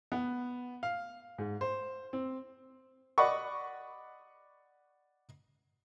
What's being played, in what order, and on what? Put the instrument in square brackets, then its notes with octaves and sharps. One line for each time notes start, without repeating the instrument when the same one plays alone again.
[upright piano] B3
F5
G#2
C5
C4
[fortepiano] D5 D#5 F#5 B5 C#6